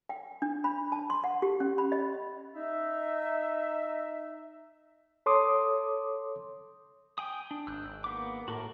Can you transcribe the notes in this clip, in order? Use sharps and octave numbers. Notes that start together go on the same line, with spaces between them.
G5
D4
B5
A5
C6
F#5
G4
C#4
B5
D#5
D#4 E5
A4 C#5 C6 D6 D#6
G5 G#5 D#6
D4
G#1 E6 F#6 G6
G#1
A#3 B3 D6
A2 F#4 A4 A#4